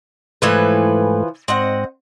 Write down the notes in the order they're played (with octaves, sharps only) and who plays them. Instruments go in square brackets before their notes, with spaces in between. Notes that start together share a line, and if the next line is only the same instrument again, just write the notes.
[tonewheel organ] G#2 A3 [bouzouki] E3 F3 B4
[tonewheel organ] G#2 [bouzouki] C4 D#5 F#5